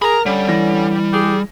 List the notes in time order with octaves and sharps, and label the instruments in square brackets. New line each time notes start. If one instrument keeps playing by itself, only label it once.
[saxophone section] G#4 A#4 [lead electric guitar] A#5 B5
[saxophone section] D3 C#4 [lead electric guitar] G3
[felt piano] E3 A#6
[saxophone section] G4 G#4